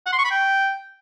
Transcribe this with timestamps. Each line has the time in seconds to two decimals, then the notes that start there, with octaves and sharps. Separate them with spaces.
0.06 F#5
0.12 C6
0.19 C#6
0.25 B5
0.31 G5